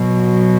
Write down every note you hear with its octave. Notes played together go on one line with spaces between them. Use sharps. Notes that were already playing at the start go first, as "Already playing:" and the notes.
Already playing: B2 F#3